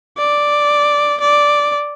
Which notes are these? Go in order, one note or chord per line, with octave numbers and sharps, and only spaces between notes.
D5
D5